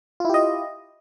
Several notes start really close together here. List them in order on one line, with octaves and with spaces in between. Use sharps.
F4 E4 G4 D#5